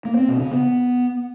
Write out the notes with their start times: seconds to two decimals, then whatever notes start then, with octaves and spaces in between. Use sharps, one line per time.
0.05 A#3
0.17 C4
0.28 B2
0.40 C#3
0.51 B3